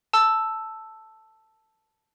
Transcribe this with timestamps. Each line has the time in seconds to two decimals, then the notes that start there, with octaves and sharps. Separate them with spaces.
0.13 A5 E6